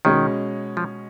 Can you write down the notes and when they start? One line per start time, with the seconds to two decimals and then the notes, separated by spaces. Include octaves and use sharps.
0.05 B2 D#3 G#3 C#4
0.77 F3